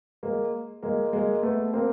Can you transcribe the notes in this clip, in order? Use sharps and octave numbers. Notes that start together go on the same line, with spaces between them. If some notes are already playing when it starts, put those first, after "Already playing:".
G#3 A#3
G#3 A#3
G#3 A#3
A3 B3
A#3 C4